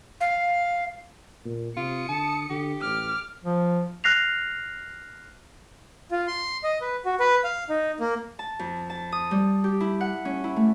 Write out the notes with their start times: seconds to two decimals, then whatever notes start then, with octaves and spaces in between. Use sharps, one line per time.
0.21 F5
1.45 A#2
1.77 C3 F4 D#6 C#7
2.09 D3 A5
2.50 D3 G4
2.81 A1 D6 F6
3.45 F3
4.04 F6 F#6 A#6 C7 F7
6.11 F4
6.27 C6
6.64 D#5
6.81 B4
7.05 F#4
7.20 B4
7.44 F5
7.69 D#4
8.00 A#3
8.39 A5
8.59 F2
8.90 A5
9.12 D#6
9.31 G3
9.64 G4
9.80 E4
10.01 F#5
10.25 C#4
10.44 E4
10.56 A3